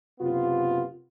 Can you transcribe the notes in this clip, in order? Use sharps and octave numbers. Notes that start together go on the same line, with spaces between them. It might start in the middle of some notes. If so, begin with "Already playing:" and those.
F#1 C3 B3 F4